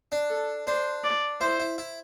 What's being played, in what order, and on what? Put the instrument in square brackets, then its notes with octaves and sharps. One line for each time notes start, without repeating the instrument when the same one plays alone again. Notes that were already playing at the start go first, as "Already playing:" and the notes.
[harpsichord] D4
[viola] A4
[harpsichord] D4 [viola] C5
[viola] D5
[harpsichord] E4 [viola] C5
[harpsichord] E4
E4